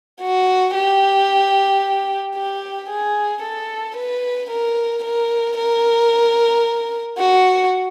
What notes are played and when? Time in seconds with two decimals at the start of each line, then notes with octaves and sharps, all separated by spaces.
0.21 F#4
0.74 G4
2.36 G4
2.90 G#4
3.42 A4
3.96 B4
4.50 A#4
5.04 A#4
5.57 A#4
7.18 F#4